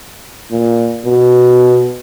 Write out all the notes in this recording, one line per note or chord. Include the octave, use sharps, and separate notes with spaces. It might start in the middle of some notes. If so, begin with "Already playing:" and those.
A#2
B2